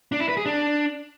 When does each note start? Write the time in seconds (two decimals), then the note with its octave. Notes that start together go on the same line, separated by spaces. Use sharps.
0.12 D4
0.20 E4
0.29 B4
0.37 G#4
0.45 D4